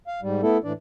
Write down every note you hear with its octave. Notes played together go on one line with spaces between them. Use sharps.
F5
G#2 G3
A3 B3 E4 A4
A2 E3 D4 D5